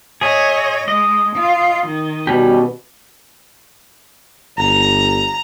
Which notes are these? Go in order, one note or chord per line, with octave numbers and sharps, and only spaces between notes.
G#4 C#5 D#5 E5
G#3 D#5
F4
D#3
B2 G3 C#4 G4
G1 A#5